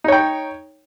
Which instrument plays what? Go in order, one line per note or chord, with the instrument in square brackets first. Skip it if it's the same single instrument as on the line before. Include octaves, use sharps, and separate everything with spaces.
[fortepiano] D#4
C#5
G5